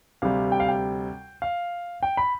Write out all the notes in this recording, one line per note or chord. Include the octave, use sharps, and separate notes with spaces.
D2 C3 G3 F5
G5
F5
G5
F5
G5
B5